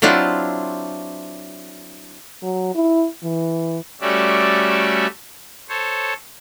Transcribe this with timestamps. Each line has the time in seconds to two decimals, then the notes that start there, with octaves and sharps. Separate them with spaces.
0.02 F#3 C4 D4 E4 F4
2.43 F#3
2.75 E4
3.24 E3
4.01 G3 A3 C#4 F#4 D5 E5
5.69 A4 C5 C#5